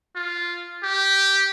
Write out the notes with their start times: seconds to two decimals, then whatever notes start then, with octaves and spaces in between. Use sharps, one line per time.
0.16 F4
0.83 G4